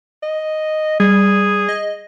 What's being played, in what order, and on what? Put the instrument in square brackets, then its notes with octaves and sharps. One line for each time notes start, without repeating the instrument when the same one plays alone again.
[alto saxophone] D#5
[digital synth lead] G3 [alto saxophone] G#4
[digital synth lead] D#5